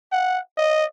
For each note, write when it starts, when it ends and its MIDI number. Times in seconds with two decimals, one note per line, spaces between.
0.12 0.40 78
0.58 0.85 75